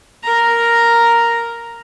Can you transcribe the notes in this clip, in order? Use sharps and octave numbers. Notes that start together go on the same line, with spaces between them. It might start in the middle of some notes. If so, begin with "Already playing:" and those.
A#4 A#5